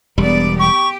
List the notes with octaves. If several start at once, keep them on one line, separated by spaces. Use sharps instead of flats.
E1 G3 B3 D5
G4 C#6